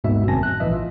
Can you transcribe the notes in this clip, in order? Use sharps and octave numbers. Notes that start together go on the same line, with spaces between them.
G#1 D#2 G#2 B2 E5
G1 F#2 C4 G#5 A5 A#6
F#6
A#1 A2 E3 D#5 E5
F4